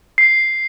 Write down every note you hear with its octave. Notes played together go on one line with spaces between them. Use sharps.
C7